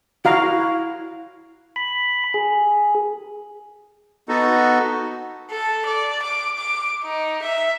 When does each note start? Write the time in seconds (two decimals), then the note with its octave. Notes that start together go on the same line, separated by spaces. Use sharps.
0.25 E4 F#4 F5 A#5
1.76 B5
2.34 G#4
4.29 B3 D#4 F#4 A4
5.51 A4
5.86 D5
6.23 D6
6.58 D6
7.04 D#4
7.43 E5